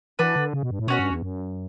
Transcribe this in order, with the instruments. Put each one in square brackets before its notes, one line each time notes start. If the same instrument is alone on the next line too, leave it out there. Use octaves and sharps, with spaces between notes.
[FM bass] E3 [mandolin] D4 F#4 B4
[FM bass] D3
C#3
B2
G2
A2
[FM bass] B2 [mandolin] C#4 F#4 C#5
[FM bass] G2
E2
F#2